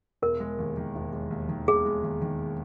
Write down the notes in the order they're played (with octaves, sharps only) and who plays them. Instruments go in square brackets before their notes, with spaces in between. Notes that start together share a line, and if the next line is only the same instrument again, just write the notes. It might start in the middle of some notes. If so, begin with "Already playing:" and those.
[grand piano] E1 [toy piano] A#4
[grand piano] G#3
D#2
D#3
E1
G#3
D#2
D#3
[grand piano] E1 [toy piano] G#4
[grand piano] G#3
D#2
D#3